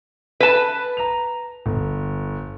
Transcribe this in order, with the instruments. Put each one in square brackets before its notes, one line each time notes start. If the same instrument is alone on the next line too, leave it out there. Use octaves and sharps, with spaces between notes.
[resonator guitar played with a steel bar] B4 A5
[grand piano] A#5 F7
G1